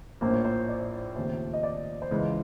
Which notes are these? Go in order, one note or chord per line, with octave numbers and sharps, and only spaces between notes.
A#1 A2 F3 A#3 C5
C#5
C5
D5
D#2 C#3 F3 A3 C4 C5
D#5
D5
C5
C#2 C#3 E3 G#3 C#4 C#5